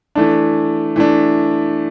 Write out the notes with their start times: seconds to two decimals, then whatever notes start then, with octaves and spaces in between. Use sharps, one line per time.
0.15 E3 A3 D4
0.96 E3 A3 D4